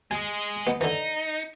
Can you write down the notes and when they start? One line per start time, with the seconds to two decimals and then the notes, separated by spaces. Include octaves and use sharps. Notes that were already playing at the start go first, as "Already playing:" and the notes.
0.11 G#3 G#4 G#5
0.67 B3 D#4
0.81 D3 E3 D#4